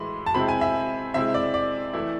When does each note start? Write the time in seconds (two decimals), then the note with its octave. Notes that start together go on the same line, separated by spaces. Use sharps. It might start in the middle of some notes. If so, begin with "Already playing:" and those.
Already playing: A2 E3 G#3 B5 C6
0.26 A5
0.34 C3 G#3 C4 E4 B5
0.48 G#5
0.61 E5
1.14 C3 G#3 C4 E4 E5
1.34 D5
1.54 D5
1.94 E3 A3 E4